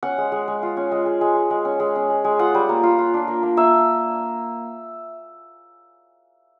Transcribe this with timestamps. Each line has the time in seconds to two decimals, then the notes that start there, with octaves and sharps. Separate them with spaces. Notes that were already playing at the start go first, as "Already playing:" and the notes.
0.03 C#4 F#5
0.18 G#3
0.32 G#3
0.48 G#3
0.63 F4
0.77 C#4
0.92 G#3
1.06 G#3
1.21 G#3
1.35 G#3
1.50 G#3
1.65 C#4
1.80 G#3
1.96 C#4
2.10 G#3
2.24 G#3
2.39 F4 F#5
2.55 G3
2.69 A#3
2.83 F4
2.98 F4
3.14 D4
3.28 A#3
3.43 A#3
3.57 A#3 E5